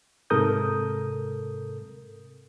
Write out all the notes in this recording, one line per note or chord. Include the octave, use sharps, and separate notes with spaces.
G#2 C3 A4 A#4 D#6 G6